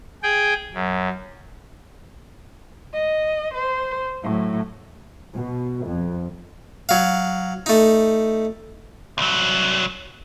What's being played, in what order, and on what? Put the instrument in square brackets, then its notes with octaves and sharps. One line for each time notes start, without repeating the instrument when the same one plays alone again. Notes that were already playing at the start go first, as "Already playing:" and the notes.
[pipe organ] G#4 G5
F#2
[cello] D#5
C5
A2 F#3
[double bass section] B2
F2
[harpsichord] F#3 F5
A3 D#4
[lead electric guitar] C2 F#3